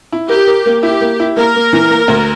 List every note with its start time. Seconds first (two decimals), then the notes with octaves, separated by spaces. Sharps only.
0.12 E4
0.29 G4 A#4
0.47 A#4
0.66 A#3
0.83 E4 G4
1.01 A#3
1.20 E4
1.37 A#3 A#4
1.55 A#3
1.73 E3
1.90 A#3
2.08 D2